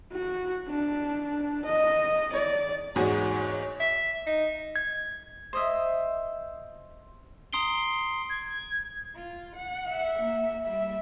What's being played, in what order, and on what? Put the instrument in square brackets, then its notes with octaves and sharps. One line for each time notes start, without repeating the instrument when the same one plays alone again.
[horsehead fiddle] F#4
D4
D#5
D5
[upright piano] E2 G#2 [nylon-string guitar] F#4 G#4 [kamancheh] C#5
[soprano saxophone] E5
D#4
[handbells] G#6
[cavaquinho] C5 D#5 E5
[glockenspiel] A#5 C6 D#6 C7 D7 G7
[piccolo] G#6
[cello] F4
F#5
[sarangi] E5
[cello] A#3
[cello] G3 [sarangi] E5